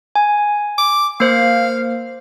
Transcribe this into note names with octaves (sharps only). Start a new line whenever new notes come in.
G#5
D6
A#3 C5 F5